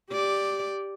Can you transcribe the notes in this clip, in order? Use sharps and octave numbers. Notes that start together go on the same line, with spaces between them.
G4 D5